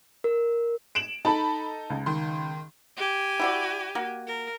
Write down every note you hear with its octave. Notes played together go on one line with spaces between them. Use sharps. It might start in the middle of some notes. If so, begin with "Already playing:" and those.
A#4
D7 E7 F#7
D#4 A4 A5 B5
C#2
D#3 C6
G4 G#5
E4 F#4 D5
A#3 F#4
A#4